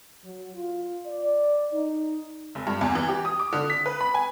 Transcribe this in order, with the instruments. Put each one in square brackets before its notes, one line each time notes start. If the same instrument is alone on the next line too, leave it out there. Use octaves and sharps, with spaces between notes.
[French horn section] F#3
F4
D5
D#4
[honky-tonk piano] F1
G2
E2
E3
G4
D#6
D6
D3
B6
B4
B5
G#5